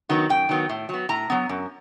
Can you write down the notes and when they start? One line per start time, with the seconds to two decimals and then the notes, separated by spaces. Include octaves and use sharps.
0.09 D#3 F#3 B3
0.29 F#2 G5
0.49 D#3 F#3 B3
0.69 A2
0.89 F#3 B3
1.09 A2 A#5
1.30 F#3 B3
1.49 F#2